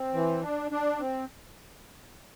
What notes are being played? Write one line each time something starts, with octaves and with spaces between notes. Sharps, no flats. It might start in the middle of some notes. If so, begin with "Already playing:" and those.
Already playing: C4
E3
D4
D4
C4